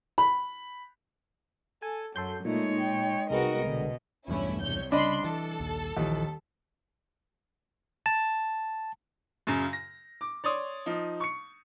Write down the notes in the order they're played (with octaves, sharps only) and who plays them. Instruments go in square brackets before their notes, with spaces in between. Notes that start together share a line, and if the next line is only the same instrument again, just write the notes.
[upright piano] B5
[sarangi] A4 [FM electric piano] G#5
[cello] F#2 [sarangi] F#3 [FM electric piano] A4 C6 G6
[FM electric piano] A#2 [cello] G#3 C#5 [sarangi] A3 [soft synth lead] D#4
[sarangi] G5
[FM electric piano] C2 G#3 B3 [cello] F#4 A#4 [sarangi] D#5
[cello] B2 [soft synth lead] D3
[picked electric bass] B1 E2 G2 [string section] A3 C#4 E4
[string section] C2 C#5 G6
[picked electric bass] C#3 [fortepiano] D4 D#5 [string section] B5 C6
[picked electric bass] E3 [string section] A4
[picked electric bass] A#1 D#2
[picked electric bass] A#1 E3 F3 [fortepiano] D#2
[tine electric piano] A5
[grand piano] F#2 C#3
A#6
D6
C#5 D5 C6 D#6
F3 D#4
C#6 C#7